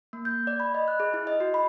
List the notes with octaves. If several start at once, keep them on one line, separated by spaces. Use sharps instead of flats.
A#3
G6
D5
B5
D#5
F#6
G#4
E4
D#5
F#4
B5